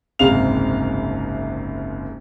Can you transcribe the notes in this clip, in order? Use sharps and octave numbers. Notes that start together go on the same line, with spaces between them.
F#1 C2 G#2 C3 F5 F7